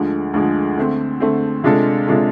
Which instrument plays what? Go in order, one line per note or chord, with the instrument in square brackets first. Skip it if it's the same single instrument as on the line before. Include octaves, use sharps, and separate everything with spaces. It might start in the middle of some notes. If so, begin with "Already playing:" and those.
Already playing: [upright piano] D2 D3 F3 G#3
D2 D3 F3 G#3
D3 A3 C4
D3 A3 C4
C3 G#3 D4 F4 A4
C3 G#3 D4 F4 A4